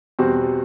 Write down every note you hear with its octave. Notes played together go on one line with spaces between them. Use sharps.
E2 B2 G3 C4 F#4